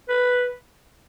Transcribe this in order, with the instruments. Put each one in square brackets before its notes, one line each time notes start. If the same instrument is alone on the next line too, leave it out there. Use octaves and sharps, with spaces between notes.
[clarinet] B4